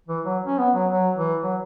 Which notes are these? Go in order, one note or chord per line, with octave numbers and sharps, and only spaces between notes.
E3
F#3
C#4
B3
F#3
F#3
E3
F#3